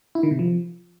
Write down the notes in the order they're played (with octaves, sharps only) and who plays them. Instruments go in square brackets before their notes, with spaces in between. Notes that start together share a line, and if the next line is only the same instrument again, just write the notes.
[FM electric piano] E4
D#3
C3
F3